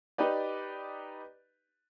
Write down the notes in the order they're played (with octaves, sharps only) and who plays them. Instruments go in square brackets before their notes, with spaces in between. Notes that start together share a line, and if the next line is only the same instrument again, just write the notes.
[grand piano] D#4 G4 B4 D5